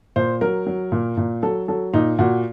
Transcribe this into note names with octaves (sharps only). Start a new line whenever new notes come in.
A#2 C5
F#3 A#4
F#3
A#2
A#2
F#3 A4
F#3 A4
A#2 D#4
A#2 F#4